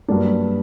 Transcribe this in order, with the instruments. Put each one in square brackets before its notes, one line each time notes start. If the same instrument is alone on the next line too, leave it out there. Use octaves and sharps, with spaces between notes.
[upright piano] G2 F#3 A#3 D4